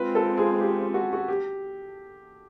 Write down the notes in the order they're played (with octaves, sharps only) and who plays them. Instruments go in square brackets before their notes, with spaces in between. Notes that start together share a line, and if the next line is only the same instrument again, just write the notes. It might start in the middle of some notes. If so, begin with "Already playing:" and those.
Already playing: [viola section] G#3 C4 F4 [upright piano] B4
[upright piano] A4
G#4
G4
F#4
F#4
G4